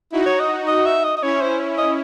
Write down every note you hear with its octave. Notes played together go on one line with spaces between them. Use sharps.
D#4 E4 F#4
C#5
D#5
D#5
E5
D#5
D#5
C#4 E4 C#5
C5
D#5